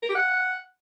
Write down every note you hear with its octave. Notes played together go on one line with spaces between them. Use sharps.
A#4
G4
F#5